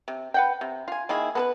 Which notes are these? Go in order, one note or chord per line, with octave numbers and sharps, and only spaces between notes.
C3
B4 F#5 G5
C3
F4 G#5
D#3 A#3 E4 G#4
B3 A4 B4